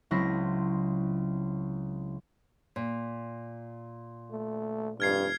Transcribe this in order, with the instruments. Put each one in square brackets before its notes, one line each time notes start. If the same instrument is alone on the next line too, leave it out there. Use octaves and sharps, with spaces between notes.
[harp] C#2 F#3 C4 E4 A#6
[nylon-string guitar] A#2
[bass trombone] A3
[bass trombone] F1 [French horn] G2 [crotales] F6 G#6 C7